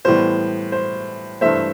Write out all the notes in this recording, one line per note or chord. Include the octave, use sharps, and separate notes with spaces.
A2 E3 G3 B3 C5
C5
G2 E3 A3 C5 E5